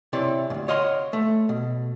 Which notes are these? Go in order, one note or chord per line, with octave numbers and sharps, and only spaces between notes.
C3 E4 C#5 D5
D2 G#2
C#5 D#5 F5 F#5 C6
A3
B2